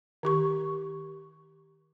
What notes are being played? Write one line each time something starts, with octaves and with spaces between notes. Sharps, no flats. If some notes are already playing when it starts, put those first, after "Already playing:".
D#3 G4 C#6